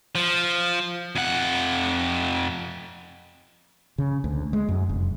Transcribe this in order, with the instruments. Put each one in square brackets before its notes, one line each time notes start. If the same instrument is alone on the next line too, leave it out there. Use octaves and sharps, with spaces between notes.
[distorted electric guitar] F3
F2 F#5
[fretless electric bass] C#3
D2
G#3
F#2
F1